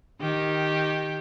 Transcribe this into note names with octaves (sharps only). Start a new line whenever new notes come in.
D#3 G4